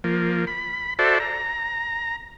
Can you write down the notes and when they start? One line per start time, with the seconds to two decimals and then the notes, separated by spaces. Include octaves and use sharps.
0.04 F3 A#3
0.47 B5
0.99 F#4 A4 C5 D5 E5 A5
1.20 A#5